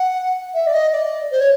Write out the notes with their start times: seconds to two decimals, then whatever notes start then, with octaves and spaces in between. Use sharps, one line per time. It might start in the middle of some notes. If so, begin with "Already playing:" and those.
Already playing: F#5
0.54 E5
0.66 D5
0.73 D#5
0.92 D5
1.31 C5
1.40 C#5